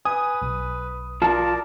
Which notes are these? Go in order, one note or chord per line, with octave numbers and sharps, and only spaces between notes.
B4 G#5 D#6
B1
F4 A#4 D5 A5